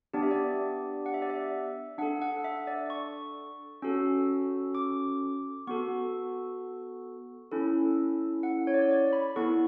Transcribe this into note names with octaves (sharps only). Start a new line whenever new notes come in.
B3 D4 G4 D5
E5
D5
F#5
E5
D5
E5
D4 A4 F#5
F#5
E5
D5
C#6
C#4 F#4 A4 E6
D6
B3 F#4 A4 C#6
C#4 E4 A4
F#5
C#5
D5
C#5
D5
B5
B3 E4 A4 C#6